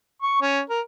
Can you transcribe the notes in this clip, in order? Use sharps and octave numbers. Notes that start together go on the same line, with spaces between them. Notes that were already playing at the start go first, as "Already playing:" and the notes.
C#6
C#4
A#4